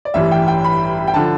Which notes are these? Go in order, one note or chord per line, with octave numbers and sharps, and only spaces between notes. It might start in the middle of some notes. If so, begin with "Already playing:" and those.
D5
A1 G2 E3 G3 E5
G5
G5
B5
G5
D3 F3 A5